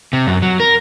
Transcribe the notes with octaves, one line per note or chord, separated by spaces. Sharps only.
C3
F#2
F#3
A#4